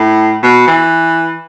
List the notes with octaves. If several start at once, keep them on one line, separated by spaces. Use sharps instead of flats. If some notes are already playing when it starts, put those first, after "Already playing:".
Already playing: A2
B2
E3